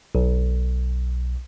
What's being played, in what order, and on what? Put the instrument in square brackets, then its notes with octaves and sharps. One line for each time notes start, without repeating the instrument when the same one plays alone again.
[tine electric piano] B1